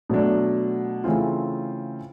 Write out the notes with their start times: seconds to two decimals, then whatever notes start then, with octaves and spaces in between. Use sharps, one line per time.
0.09 B2 F#3 A3 D4
1.04 C#3 E3 A3 C4 F4